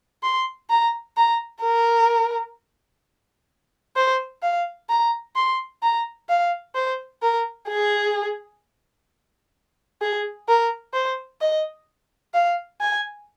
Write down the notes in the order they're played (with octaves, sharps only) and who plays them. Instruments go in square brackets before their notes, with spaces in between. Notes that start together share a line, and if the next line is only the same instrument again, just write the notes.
[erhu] C6
A#5
A#5
A#4
C5
F5
A#5
C6
A#5
F5
C5
A#4
G#4
G#4
A#4
C5
D#5
F5
G#5